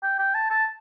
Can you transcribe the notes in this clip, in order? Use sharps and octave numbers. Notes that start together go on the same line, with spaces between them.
G5
G5
A5
A5